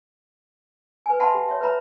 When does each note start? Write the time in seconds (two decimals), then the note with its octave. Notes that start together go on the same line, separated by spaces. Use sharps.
1.06 B4 G#5
1.19 E5 F#5 A5 B5 C6
1.34 G4
1.49 C#5 E5
1.61 B4 C#5 E5 A#5 B5